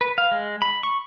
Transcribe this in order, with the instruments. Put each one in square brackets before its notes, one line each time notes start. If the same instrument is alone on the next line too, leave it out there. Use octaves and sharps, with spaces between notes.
[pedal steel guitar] B4
F5
G#3
B5
C#6